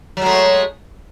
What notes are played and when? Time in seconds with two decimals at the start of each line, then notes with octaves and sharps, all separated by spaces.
0.17 F#3
0.21 G#3
0.26 A3